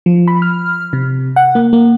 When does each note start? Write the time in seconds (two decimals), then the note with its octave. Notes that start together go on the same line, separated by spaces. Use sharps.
0.06 F3
0.28 B5
0.42 F6
0.93 C3
1.36 F#5
1.55 A#3
1.73 A#3